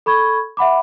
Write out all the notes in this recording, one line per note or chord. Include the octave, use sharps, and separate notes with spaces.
A4 B5 C#6 G#6
E5 F#5 B5 D6